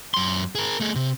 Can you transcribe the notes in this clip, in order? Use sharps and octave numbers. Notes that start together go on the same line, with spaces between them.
F#2 C6
G#4 A#4
A3 G#4
C3